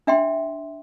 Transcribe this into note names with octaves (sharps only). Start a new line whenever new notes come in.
D4 E5 G5 C6